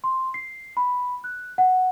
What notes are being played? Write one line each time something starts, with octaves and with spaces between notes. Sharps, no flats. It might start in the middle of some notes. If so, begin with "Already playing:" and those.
C6
C7
B5
F#6
F#5